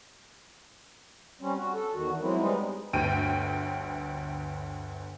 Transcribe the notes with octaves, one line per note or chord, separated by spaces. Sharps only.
G3 C4 C#4
F#4
A4
E2 D#3 F#4
F#3 G#3 C4 E4
G3 G#3 B3 C4 D#4
G1 D2 G5 D7 D#7